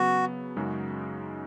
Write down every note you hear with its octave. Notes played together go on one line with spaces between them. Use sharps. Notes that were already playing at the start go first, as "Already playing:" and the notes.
Already playing: C#3 F#3 B3 F#4
F#2 C#3 G#3 D#4 F#4